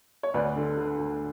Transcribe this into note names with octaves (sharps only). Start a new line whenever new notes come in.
C#5
D2 B4 D5
D3
D3
D2